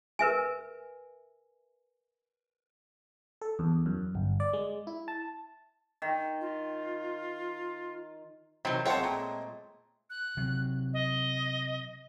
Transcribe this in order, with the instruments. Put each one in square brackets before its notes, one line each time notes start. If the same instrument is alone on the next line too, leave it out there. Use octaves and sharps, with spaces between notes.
[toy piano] A#4 B4 E5 G#5
[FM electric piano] A4
E2
F#2
G1
D5
G#3
E4
A5
[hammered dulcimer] D#3
[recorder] F4
[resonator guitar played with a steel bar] C3 E3 F#3 [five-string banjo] D#3 C4
[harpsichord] G#3 A3 C4 [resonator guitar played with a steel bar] F4 F#5 A5 [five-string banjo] C#5 G5
[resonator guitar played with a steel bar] A#2
[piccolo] F#6
[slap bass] C3 F#3
[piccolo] D#5